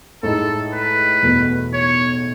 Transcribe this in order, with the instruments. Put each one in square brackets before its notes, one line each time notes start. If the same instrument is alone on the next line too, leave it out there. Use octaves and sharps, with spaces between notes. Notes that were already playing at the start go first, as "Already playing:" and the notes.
[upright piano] A2 G#3 D#4 [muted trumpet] A4
[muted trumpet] B4
[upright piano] E2 B2 A3
[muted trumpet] C#5